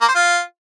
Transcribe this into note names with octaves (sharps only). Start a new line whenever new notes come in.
A#3
C5
F4